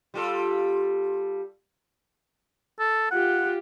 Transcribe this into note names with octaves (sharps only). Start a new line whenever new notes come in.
G3 F4 A4
A4
F4 G4 F#5